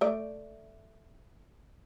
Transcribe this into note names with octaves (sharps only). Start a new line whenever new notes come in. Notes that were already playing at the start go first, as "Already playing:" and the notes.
A3 D5